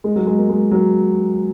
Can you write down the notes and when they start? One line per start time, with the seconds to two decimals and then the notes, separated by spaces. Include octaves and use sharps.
0.04 G#3
0.16 F#3
0.27 G#3
0.38 A#3
0.50 G#3
0.71 F#3